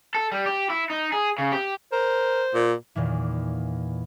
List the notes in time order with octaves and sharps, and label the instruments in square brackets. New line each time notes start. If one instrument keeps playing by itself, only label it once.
[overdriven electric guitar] A4
G3
G4
E4
D#4
G#4
C#3
G4
[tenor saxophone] A#4 [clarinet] C5
[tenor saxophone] A#2
[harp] E2 A#2 D#3 E3